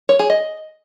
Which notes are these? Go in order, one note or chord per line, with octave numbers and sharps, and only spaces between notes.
C#5
G#4
D#5